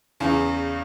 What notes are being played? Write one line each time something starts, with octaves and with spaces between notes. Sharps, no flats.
E2 C#3